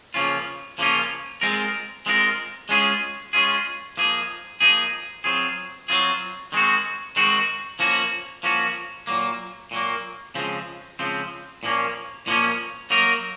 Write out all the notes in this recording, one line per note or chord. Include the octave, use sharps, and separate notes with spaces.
C#3 F3 A#3 C#4 F4
C#3 F3 A#3 C#4 F4
G#3 C4 F4 A#4
G#3 C4 F4 A#4
G#3 C#4 F4 G#4
G#3 C#4 F4 G#4
F3 A#3 D#4 G#4
F3 A#3 D#4 G#4
F#3 C4 F4 G#4
F#3 C4 F4 G#4
D#3 G#3 C4 F#4
D#3 G#3 C4 F#4
F3 A#3 C#4 F#4
F3 A#3 C#4 F#4
A#2 F#3 A#3
A#2 F#3 A#3
C#3 F3 G#3 C4
C#3 F3 G#3 C4
A#2 F3 A#3 C#4
A#2 F3 A#3 C#4
F#3 A#3 D#4 A#4